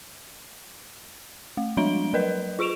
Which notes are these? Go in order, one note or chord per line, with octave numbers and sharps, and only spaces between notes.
A3
F3 G3 G#3 D4 D7 G7
F#3 A#4 B4 D#5
F4 G#4 C#6 D7 E7 F7